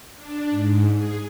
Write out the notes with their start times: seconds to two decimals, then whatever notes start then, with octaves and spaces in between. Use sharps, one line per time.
0.15 D4
0.50 G#2
0.95 G#4